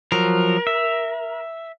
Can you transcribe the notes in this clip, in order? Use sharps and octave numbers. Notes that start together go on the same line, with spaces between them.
F3 F#3 A#4
E5